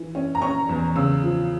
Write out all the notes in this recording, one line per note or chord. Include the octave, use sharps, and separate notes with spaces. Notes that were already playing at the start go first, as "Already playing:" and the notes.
Already playing: E3
C#4
A#5
C#4 C#6
E2
C#3 E6
F3